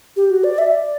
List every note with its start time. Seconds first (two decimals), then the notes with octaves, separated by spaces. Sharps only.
0.17 G4
0.30 F#4
0.44 D5
0.58 E5
0.72 D5